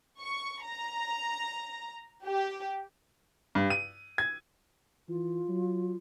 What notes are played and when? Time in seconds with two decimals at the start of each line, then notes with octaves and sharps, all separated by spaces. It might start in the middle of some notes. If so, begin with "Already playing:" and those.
0.20 C#6
0.64 A#5
2.24 G4
3.55 G2
3.70 D#7
4.18 G#6
5.09 E3 F4
5.49 F#3